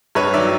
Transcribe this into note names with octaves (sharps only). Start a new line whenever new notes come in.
G2 B4 C#5
D#3 F#3 D5 E5